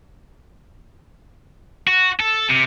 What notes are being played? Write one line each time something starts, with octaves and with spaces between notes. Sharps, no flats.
F#4
A4
C3